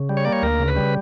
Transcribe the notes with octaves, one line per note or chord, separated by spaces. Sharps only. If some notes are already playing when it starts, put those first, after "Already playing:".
Already playing: C#3
G3
C#5
A#3 D5
C#5
D2 A#4
C#3
B4
G3